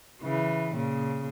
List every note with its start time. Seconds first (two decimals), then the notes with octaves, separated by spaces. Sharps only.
0.22 C#3 E3
0.73 A#2 C#3